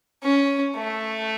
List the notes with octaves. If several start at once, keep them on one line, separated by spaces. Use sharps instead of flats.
C#4
A3